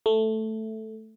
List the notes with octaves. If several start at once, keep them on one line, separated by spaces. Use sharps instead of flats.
A3